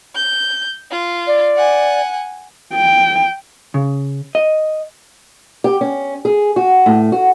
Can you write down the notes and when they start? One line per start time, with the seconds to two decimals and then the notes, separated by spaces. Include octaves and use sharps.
0.15 G6
0.91 F4
1.27 D5
1.57 F#5 G#5
2.74 G5
3.74 C#3
4.35 D#5
5.64 G4
5.81 C#4
6.25 G#4
6.56 F#4
6.86 A2
7.12 F#4